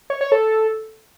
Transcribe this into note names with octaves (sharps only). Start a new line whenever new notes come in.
C#5
C#5
A4